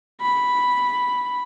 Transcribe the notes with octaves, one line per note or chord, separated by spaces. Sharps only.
B5